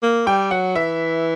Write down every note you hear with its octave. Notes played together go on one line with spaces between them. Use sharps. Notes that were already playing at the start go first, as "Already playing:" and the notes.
A#3
G3 G5
F#3 F#5
E3 E5